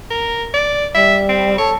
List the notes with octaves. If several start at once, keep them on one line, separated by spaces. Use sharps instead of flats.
A#4
D5
G3 E5
C4
A4 C#5